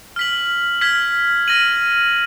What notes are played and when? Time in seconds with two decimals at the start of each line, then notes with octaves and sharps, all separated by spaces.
0.16 F6 B6 F#7
0.81 F6 G#6 B6
1.48 F6 A#6 D#7 F#7